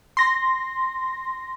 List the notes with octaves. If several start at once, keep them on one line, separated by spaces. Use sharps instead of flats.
C6 A#6